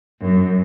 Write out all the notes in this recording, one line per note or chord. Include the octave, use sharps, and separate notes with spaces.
F#2